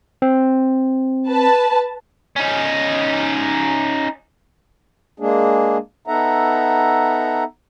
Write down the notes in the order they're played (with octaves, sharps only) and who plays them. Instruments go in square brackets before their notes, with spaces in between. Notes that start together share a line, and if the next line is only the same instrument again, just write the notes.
[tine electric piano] C4
[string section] B4 A5
[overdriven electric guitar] C#4 D#4
[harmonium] G#3 A#3 D4 G#4
B3 D#4 A4 E5 F#5 A#5